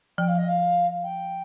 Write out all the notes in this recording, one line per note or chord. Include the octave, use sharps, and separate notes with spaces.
F3 G5
F5
D#5
F5
G5